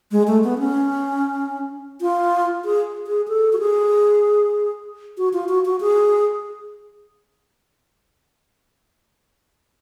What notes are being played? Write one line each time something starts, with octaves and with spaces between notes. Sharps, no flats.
G#3
A3
B3
C#4
F4
G#4
G#4
A4
F#4
G#4
F#4
F4
F#4
F#4
G#4